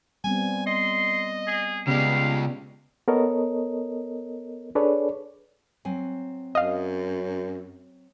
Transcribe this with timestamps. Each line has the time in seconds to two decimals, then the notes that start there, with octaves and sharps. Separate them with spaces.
0.24 G3 B3 C4 G#5
0.66 D#5 C6
1.47 G#4
1.88 C#3 G#3 B3 G4 D5 F5
3.08 B3 A4 A#4 C#5 D#5
4.75 D4 G#4 A4 B4 C#5 D5
5.85 F#3 C4 G#5
6.55 F#2 D#5 F5